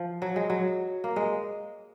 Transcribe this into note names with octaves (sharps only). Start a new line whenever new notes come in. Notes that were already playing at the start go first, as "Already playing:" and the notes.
Already playing: F3
F#3
G#3
F#3
A#3
G#3